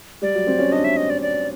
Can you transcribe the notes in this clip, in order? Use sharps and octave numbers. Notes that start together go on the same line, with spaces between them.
G3 D5
F#3
C4
C#4
D4 D#5
E5
D#5
D5
D5